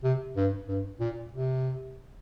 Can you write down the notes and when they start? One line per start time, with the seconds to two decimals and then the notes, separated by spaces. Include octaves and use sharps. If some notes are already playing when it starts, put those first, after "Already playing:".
0.03 C3
0.36 G2
0.68 G2
1.00 A#2
1.33 C3